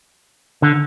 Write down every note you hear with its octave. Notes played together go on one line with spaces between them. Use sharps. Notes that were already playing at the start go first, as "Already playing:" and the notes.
D3